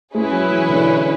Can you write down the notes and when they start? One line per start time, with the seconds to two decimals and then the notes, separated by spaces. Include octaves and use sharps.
0.14 G#3 C#4 E4 G#4 B4
0.32 F#3
0.50 E3
0.69 D3